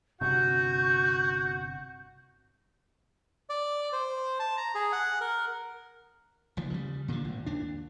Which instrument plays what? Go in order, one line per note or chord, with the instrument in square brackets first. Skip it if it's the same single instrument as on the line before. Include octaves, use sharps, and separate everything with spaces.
[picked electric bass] G1 C3 [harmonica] F#4 F#5 [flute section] C#6 G6
[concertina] D5
C5
A5
A#5
G#4
F#5
A#4
[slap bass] F1 D#2 F3
C#3 G3
A#2 D3 D#3 F3
G#1
D#2 D4